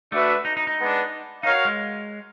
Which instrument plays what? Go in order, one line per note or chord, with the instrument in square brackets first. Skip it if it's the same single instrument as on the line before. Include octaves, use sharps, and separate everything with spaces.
[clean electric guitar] A3 [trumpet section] D4 F#4 B4 E5
[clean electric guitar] D#4
D#4
D#4
[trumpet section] G#3 B3 D4
[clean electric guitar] D#4 [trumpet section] F#4 A#4 C#5 F5
[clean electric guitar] G#3